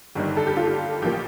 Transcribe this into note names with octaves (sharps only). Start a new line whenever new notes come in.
G1 G2 D#3 G3
A4
G4
F4
G4
A1 F3 A#3 G4